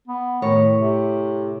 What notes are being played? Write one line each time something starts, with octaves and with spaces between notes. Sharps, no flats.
B3
A2 D#3 C#5
C3